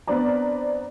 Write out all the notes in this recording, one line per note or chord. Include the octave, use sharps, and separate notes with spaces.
B3 C4 D4 C5 D5 A#5